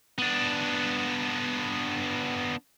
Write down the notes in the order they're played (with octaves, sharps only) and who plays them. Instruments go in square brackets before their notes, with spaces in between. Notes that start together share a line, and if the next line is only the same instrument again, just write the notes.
[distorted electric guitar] B3 D4